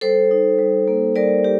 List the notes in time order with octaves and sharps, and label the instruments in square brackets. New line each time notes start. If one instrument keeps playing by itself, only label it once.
[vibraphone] G3 A4 C5
D#4
G3
A#3
G3 A#4 D5
D#4 G4